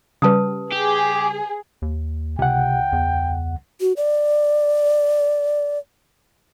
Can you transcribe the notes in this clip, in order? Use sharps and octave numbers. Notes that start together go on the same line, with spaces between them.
C#3 G3 B4 A5 D#6
G4 G#4
D#2
C#2 C3 F#5 G5
E2
F#4
D5